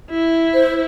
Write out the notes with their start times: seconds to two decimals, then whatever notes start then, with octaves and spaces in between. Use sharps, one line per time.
0.10 E4
0.54 C5